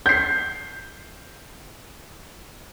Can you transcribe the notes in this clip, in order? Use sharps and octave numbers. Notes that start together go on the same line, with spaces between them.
G6 C7